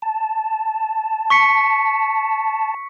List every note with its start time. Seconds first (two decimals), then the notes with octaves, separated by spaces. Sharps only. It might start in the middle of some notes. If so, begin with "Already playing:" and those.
0.02 A5
1.30 C#6 B6 C#7